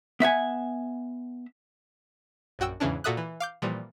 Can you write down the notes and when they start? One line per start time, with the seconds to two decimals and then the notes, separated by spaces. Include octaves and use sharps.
0.20 B3 E5 F#5 G#5
2.59 A#1 F#2 F#4 G5 E6
2.80 E2 G#2 C#3 E3 C#4 D4
3.04 A#2 F#4 A4 E5 D#6 F#6
3.17 E3
3.40 F5 D6 G6
3.62 A#2 E3 F3 G3